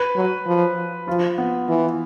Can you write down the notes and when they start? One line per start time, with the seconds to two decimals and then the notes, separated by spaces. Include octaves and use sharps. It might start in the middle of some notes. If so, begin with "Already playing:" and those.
Already playing: B4
0.16 F#3
0.46 F3
1.07 F3 F4
1.38 B3
1.68 E3